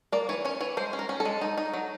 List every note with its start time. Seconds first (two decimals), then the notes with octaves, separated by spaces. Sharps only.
0.12 A#3 D5
0.29 E3 C#5
0.45 C#4 C#5
0.61 E3 C#5
0.77 G#3 C5
0.93 C#4
0.99 A#4
1.09 C#4
1.20 A4
1.25 G#3
1.41 D#4
1.58 D#4
1.74 F#3